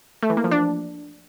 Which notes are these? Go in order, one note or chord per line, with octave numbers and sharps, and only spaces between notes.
A3
E3
A#3
F3
D4